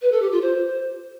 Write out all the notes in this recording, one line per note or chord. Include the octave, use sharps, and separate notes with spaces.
B4
A4
G4
F4
C5